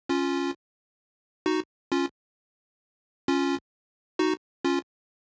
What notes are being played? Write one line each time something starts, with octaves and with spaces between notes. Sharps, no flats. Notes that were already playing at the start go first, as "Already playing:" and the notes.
C#4 F4
D#4 F#4
C#4 F4
C#4 F4
D#4 F#4
C#4 F4